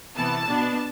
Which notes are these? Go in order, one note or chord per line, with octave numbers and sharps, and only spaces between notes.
C3 E3 B3 A5
B2 B3 D4